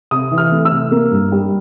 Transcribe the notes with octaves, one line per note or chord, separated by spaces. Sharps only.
C3 D#6
E3
F6
A3
E6
C3
A#3
G2
G3